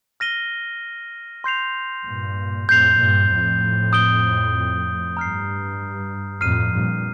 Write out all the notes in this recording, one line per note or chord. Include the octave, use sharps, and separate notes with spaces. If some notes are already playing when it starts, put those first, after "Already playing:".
F6 A#6 D#7 G7
C6 G6 C7 F7
G2 A#2
F2 A2 G6 C7 F7
G2 A#2
F2 A2
D#6 G6 D7 G7
G2 A#5 F6 C7
F2 A2 F6 C7 D#7
G2 A#2